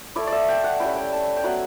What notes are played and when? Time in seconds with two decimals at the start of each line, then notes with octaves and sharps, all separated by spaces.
0.16 A3 E4 D5
0.27 D5 E5
0.48 G5
0.64 F#5
0.80 G3 C#4 E4 G5
0.96 G5
1.12 A5
1.37 G5
1.44 F#3 B3 E4 F#5